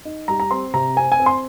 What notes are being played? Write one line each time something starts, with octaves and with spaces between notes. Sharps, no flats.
D#4
G3 A#5
A#5
C4 C6
C3 A#5
C4 G#5
G#5
C4
C6